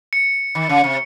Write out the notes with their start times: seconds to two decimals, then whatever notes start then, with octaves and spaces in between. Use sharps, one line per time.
0.13 C#7
0.55 D#3
0.69 C#3
0.84 C3